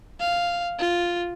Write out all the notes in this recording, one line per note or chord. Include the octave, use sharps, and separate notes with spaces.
F5
F4